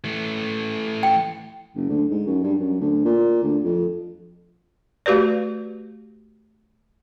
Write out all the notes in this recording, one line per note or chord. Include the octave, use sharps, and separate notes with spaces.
E3 A3
G5
F#1
D2
G#2
F#2
G2
F#2
D2
A#2
D2
F2
A3 F#4 G4 B4 D5